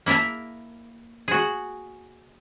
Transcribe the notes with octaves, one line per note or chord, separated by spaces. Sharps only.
A#3 E4 A#4 E5 A5
F#4 G#4